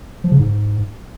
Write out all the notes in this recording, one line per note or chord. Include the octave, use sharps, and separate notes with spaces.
F3
C#3
G#2